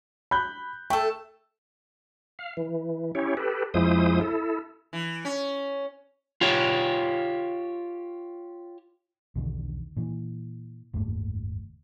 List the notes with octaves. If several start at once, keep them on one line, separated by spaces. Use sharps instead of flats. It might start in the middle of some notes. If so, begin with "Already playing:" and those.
B5 F#6 G6
A3 A4 G5
F5
E3
C#4 E4 G4 C#5
G4 A4 B4
F2 F3 G#3 E4 C5 D#6
E4 A4
E3
C#4
F4 G4 C#5
B1 E2 D3 D#3
A#2 E3
F#1 D#2 G#2 A3